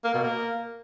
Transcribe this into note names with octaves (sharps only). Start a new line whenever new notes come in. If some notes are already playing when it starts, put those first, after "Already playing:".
A#3
B2
A#3